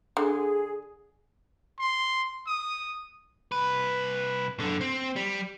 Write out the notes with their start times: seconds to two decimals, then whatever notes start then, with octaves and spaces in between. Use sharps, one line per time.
0.17 D3 G#4
1.79 C6
2.47 D#6
3.52 C2 B4
4.60 F#2 D3
4.81 C4
5.16 G3